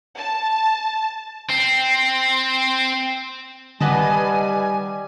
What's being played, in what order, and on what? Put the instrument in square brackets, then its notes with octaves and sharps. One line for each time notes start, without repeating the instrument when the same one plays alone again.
[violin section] A5
[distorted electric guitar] C4
[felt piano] D#3 F#5 D6 [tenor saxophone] G3 [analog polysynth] B4 D#5 A5 [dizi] G#5